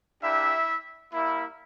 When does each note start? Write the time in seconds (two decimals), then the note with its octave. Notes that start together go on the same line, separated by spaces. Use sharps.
0.22 A#3 D4 E4 G4 E5
1.13 G3 A#3 E4